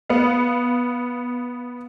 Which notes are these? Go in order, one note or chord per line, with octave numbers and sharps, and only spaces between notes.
B3 F5